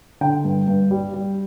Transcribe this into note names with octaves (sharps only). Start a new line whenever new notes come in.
D3 G5
G2
G2
G3
G3